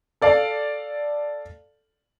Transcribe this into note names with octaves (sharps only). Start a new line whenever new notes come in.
A4 D5 F5 A5